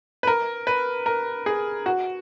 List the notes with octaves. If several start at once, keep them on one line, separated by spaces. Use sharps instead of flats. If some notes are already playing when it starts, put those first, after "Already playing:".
B4
A#4
B4
A#4
G#4
F#4